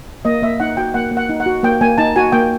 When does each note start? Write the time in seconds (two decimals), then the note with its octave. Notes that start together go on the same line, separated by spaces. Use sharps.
0.25 A#3 D#5
0.43 A#3 E5
0.60 D#4 F#5
0.77 F#4 G5
0.94 A#3 F#5
1.11 A#3
1.17 F#5
1.29 D#4
1.40 F#5
1.46 F#4
1.63 A#3 G5
1.81 A#3 G#5
1.98 D#4 A5
2.16 F#4 G#5
2.32 A#3 G5